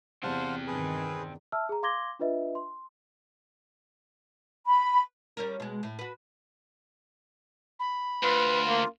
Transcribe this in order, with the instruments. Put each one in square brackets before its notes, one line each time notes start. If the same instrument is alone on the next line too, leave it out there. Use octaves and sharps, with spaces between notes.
[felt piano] E2 C3 [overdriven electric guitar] C4 A5 [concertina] C5 F5 F#5
[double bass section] G2 D#3 [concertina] G#4 B4
[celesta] E5 A5 E6 F6
G#4 A#5
F5 C6 D6 G#6 A#6 G7
D4 F4 B4 D#5 E5
C6
[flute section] B5
[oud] G3 C#4 A#4
B2 G#3
A2
F#4 B4
[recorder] B5
[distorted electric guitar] D2 [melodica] F4 [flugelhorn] B4
[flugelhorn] A#3